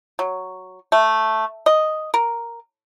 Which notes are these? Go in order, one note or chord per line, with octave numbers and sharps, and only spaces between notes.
F#3
A3
D#5
A#4